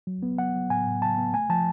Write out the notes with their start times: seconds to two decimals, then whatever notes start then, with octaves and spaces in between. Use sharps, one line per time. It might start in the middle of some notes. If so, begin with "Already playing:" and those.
0.07 F#3
0.23 B3
0.38 F#3 F#5
0.55 F#3
0.70 A2 G#5
0.87 A2
1.02 F#3 A5
1.17 B3
1.33 A3 G#5
1.50 F3 A5